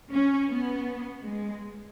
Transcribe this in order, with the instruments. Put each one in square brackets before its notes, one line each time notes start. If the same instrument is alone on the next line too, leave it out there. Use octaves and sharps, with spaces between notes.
[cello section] C#4
B3
G#3